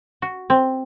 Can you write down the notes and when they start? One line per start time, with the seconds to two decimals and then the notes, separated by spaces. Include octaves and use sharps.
0.22 F#4
0.50 C4